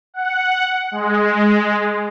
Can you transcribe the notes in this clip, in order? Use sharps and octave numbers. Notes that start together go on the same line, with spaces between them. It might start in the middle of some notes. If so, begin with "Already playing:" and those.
F#5
G#3